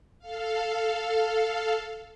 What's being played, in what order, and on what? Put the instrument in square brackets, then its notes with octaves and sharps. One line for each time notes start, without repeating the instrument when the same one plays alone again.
[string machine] A4 F5